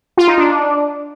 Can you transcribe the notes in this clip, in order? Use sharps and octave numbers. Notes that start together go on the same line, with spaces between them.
F4
D#4
D4